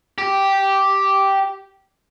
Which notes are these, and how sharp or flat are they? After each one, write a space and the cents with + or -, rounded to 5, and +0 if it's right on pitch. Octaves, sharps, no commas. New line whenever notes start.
G4 -5